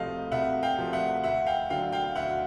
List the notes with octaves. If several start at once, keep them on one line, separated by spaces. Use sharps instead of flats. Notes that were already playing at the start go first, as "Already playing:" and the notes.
Already playing: C2 C3 F3 A3 D#5 F5
C2 E5 F#5
F5 G5
C3 F3 A3
E5 F#5
D2 E5 F#5
F5 G5
D3 F#3 F5 G5
F5 G5
D2 E5 F#5